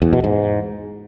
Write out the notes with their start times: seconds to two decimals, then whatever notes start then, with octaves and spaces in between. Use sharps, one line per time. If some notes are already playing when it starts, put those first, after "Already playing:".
0.02 E2
0.13 B2
0.24 G#2